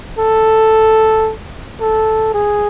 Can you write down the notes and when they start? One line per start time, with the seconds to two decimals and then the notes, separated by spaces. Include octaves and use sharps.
0.19 A4
1.81 A4
2.34 G#4